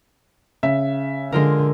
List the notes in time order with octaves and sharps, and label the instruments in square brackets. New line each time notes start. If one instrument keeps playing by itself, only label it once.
[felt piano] C#3 E5
[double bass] D3 [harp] G#3 F4 A#4